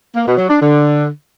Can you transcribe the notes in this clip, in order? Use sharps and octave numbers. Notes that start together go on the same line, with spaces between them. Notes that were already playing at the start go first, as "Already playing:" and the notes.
A#3
B2
F#3
D4
D3